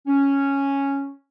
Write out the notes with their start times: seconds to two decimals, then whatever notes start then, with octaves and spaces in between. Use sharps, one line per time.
0.07 C#4